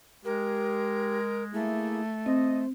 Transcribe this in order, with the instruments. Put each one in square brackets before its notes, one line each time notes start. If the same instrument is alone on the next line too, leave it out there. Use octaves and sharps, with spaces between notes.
[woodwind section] G#3 [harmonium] G4 [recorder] A#4
[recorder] A3 [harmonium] A#3 E4 G#4
[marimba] C4 [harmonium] C5 [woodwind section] D#5